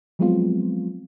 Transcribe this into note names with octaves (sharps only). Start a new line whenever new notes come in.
F3 F#3 G#3 B3 C4 F4